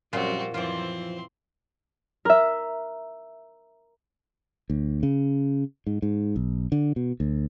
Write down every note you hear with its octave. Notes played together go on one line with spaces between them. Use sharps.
F#2 A#2 F3 G3 C4 F4 F#4
F#2 E3 F3 C4 F4 C5 D5
A#4 E5
D2
C#3
G#2
G#2
B1
D3
B2
D2